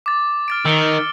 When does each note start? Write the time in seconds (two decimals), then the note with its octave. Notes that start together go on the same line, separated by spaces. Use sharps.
0.06 D6 A6
0.48 F6 A6 D7
0.65 D#3 E6 C#7 G7